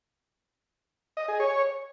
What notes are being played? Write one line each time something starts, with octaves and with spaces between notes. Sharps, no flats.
D#5
G#4
C#5